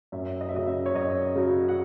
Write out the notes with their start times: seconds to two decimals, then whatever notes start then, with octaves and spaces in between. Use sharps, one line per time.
0.12 F#2 E5
0.41 D#5
0.49 E5
0.54 C#3 F#3 D#5
0.67 E5
0.86 C#5
0.94 F#2 D#5
1.35 C#3 F#3
1.69 F#5